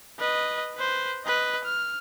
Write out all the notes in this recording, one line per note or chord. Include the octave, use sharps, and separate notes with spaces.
B4 D#5
B4 C5
B4 D#5
F6